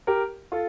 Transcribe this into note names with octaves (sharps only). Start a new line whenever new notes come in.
G4 A#4
F4 A4